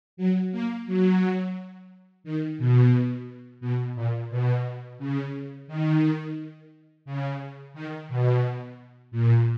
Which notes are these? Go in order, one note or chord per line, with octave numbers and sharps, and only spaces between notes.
F#3
A#3
F#3
D#3
B2
B2
A#2
B2
C#3
D#3
C#3
D#3
B2
A#2